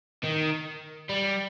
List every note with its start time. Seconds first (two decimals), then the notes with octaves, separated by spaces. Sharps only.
0.24 D#3
1.09 G3